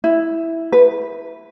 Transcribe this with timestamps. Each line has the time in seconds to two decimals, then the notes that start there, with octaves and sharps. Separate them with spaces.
0.04 E4
0.72 B4